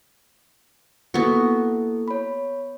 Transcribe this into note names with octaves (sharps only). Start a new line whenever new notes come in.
A#3 B3 E4 F#4 A4
C#5 B5